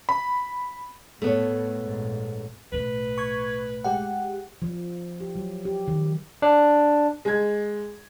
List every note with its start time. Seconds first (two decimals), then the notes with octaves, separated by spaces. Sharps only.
0.09 B5
1.22 A2 A3 B3 C#5
1.83 A#1 G#2
2.72 B1 A2 B4
3.18 C#6 G#6
3.84 G#3 G4 F#5
4.62 F3
5.20 G4
5.36 F#3
5.65 G4
5.88 D#3
6.42 D4
7.25 G#3 G#6